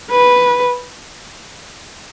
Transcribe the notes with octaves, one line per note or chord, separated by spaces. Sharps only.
B4